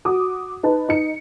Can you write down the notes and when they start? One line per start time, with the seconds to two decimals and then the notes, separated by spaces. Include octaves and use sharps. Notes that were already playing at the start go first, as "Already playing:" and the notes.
0.05 F#4 D6 D#6
0.63 D#4 B4 A5
0.89 D#4 C#7